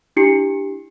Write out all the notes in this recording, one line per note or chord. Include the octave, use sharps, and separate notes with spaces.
D4 E4 G4 C7 C#7